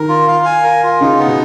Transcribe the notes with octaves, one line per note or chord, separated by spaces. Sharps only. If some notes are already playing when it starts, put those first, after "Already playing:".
Already playing: D#3 A#4
F4
F5
G#5
A#4
F4
C#3 D#4
B3
B2